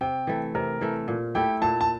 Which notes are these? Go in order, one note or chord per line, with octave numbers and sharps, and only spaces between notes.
C3 G5
E3 A3
C3 A#4
E3 A3
A#2
A3 E4 G4 G5
A#2 A5
A5